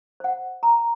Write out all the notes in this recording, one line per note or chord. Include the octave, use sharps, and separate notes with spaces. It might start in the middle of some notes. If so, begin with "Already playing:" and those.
C5 F#5
A#5